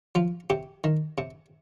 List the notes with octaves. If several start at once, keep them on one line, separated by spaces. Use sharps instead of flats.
F3 F4
C3 G4
D#3
C3